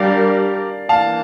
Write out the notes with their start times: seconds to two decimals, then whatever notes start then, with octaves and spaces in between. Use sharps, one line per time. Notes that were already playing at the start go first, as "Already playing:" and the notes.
Already playing: G3 D4 G4 A#4 D5 F5
0.89 E3 A#3 D4 F5 A5